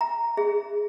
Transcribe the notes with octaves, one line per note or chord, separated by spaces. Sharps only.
A#5
G#4